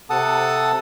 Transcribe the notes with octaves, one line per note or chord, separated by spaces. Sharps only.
C3 A4 F#5 A5 D#6